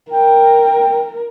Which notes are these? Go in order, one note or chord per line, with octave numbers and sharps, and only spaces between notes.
A#4 G5